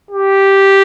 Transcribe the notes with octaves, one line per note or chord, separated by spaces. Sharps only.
G4